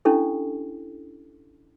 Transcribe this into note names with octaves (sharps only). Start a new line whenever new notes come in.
C#4 D4 E4 G4 A4